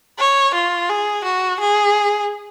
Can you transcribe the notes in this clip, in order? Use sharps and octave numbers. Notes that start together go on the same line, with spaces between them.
C#5
F4
G#4
F#4
G#4